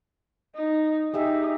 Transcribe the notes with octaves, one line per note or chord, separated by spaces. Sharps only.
D#4
D#4 G4 G#4 E5